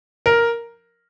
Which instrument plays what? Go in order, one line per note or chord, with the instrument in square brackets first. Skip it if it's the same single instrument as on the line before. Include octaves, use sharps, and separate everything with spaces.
[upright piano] A#4